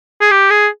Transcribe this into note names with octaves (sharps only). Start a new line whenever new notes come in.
G#4
G4
G#4